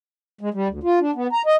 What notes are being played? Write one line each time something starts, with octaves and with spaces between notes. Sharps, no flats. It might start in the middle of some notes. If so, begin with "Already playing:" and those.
G#3
G3
D2
F4
D4
B3
A#5
D#5